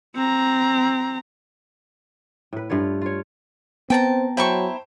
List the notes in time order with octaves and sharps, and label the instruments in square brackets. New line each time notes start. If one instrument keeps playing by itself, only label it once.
[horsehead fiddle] C4 A#5
[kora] A2 B4
G2 A3 F4 C#5
F4 C#5
[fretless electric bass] B3 [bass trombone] C4 [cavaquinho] G5 A5 A#5
[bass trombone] F#3 [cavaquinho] E4 A#5 C#6 [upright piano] C5 G5 A5